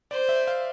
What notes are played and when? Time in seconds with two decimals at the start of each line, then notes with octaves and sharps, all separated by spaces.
0.11 C5 D5
0.29 E5
0.47 F5